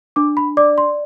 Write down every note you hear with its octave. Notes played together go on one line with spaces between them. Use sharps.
D4 D6
B5
D5 D6
C6